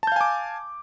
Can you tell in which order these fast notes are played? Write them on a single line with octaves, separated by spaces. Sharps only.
A5 G6 F5 G#5 D6